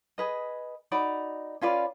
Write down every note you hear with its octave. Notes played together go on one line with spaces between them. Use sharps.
G#4 B4 D#5
D#4 F#4 D5 B5
C#4 F4 B4 D5